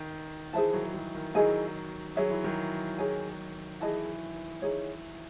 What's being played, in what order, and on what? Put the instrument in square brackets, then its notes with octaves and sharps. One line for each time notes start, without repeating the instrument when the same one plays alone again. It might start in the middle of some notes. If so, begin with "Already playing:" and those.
Already playing: [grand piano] D#3
[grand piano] E3 [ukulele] G#4 C5 E5 A5
[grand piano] D#3 F#3
D#3 F#3
D#3
[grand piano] D#3 F#3 [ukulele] E4 G#4 D#5 G#5
[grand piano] F#3 [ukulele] G#4 C#5 E5
[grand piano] E3
D#3 F#3
[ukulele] G#4 C#5 G#5
[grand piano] E3 [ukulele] G#4 D#5 A5
[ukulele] D#4 G#4 C#5